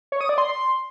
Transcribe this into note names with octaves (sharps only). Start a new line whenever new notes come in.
C#5
D#6
D5
C6